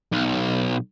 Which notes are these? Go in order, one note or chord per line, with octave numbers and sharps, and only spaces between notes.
B1